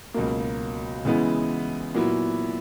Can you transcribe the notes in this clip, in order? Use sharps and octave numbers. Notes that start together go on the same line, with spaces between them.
C#2 B2 F#3 A#3
C#3 E3 G#3 B3 E4
A#2 F#3 B3 E4